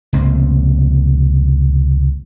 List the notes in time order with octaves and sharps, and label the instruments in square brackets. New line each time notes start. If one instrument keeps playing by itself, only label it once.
[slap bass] F1 C#2 A#3 C4